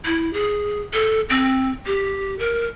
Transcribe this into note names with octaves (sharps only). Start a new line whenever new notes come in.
E4
G#4
A4
C4
G4
A#4